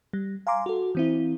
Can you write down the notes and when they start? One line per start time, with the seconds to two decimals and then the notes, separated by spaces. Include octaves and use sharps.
0.13 G3
0.47 F5 G#5 A#5 C6 D6
0.66 F#4 A4
0.95 E3 C4 E4